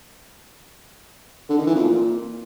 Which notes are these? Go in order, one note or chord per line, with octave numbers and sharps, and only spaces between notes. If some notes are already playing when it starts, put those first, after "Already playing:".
D3
D#3
E3
F2
A#2